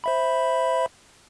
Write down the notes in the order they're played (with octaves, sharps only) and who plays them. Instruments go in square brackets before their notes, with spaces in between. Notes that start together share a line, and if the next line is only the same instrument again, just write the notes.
[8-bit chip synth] C5 E5 B5